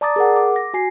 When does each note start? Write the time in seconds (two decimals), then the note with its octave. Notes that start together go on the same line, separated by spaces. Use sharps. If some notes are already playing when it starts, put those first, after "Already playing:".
0.01 D5 A5 A#5 D6 D#6 A6
0.16 G#4 A#4 F#5
0.36 D6
0.56 A#6
0.74 F#4 G#5 C7